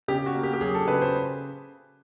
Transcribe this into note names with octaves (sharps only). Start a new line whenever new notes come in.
C#3 G4
F#4
A#3
G4
G4
F#3 G#4
A4
C#3 B4
C5